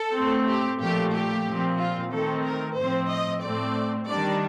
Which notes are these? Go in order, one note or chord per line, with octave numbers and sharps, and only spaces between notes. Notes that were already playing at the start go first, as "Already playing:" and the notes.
Already playing: A4
A2 A3 C4
G4
A#2 F3 A3 G4
G4
A#2 F3 C4
F4
D#3 A3 C4 A4
A#4
A2 F3 C4 C5
D#5
A2 A3 C4 D5
D#3 G3 D4 D5